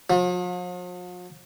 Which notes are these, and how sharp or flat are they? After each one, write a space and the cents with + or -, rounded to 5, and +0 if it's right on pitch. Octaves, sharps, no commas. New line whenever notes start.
F3 +45